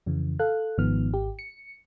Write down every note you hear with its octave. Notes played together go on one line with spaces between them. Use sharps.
F2 C#3 E3
A4 F5 F#6
G#1 G#2 D#3 F3 B3 F6
G#1 G4
C#7